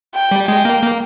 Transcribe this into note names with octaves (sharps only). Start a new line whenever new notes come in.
G5
G3
G#3 G5
A#3
A#3